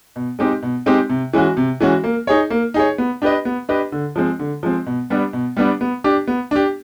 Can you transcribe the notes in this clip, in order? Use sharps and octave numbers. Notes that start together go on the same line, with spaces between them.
B2
G#3 C4 D#4 G4
B2
G#3 C4 D#4 G4
C3
E3 G#3 C#4 F#4
C3
E3 G#3 C#4 F#4
A#3
D#4 G#4 C#5
A#3
D#4 G#4 C#5
B3
D4 G4 B4 D#5
B3
D4 G4 B4 D#5
D3
F3 G#3 C4
D3
F3 G#3 C4
B2
G3 B3 D4
B2
G3 B3 D4
B3
D4 G4
B3
D4 G4